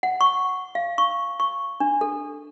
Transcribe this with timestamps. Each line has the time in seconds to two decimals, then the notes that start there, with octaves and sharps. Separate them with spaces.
0.03 F#5
0.21 C#6
0.75 F5
0.98 C#6
1.40 C#6
1.80 D4
2.01 A4